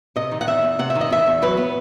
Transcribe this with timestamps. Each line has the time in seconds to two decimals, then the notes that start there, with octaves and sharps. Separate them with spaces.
0.16 C3 D#5
0.32 D#3
0.41 F#5
0.47 E2 E5
0.63 E2
0.79 C3 F#5
0.90 E5
0.95 D#3
1.01 D#5
1.10 E2 E5
1.26 E2
1.42 F#3 B4
1.57 B3